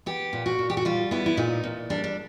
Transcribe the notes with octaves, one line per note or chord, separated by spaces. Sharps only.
B3 G4
A#2
F#4
A#2
G4
F#4
G3 F4
B3 E4
E4
A#2 D#4
A#2
G3 D4
D4